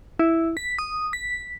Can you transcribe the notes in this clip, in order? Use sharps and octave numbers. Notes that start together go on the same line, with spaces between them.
E4
B6
D#6
B6